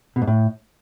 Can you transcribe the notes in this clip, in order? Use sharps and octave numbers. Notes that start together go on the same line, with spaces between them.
B2
G#2
A2